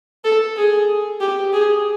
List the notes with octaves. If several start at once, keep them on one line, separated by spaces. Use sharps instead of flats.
A4
G#4
G4
G#4